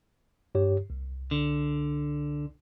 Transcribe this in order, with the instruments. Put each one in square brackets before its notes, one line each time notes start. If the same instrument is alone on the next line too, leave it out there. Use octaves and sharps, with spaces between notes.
[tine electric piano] G2 G4 C#5
C2
[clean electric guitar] D3